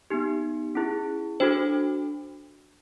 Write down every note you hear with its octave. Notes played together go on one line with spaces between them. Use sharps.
B3 D#4 G4
C#4 E4 G#4
D4 F#4 A4 C5